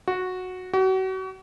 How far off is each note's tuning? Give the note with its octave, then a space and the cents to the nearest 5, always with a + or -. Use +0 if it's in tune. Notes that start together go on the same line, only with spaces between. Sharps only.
F#4 -10
F#4 +35